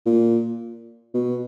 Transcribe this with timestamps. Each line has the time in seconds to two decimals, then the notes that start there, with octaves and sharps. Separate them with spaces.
0.06 A#2
1.14 B2